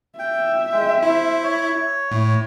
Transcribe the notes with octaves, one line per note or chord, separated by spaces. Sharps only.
E5 G5
G#3 G5
E4 C5
C#5
A2